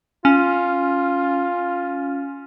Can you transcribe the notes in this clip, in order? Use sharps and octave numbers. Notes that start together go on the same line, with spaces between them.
C#4 F4